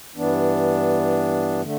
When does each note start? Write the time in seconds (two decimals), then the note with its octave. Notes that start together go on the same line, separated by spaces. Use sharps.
0.16 G2 E3 B3 D4
1.62 D3 A3